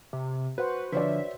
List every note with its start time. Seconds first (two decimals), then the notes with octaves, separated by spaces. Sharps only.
0.13 C3
0.58 F#4 B4 C5 F#5
0.92 D3 F3 B4 C#5 D5 E5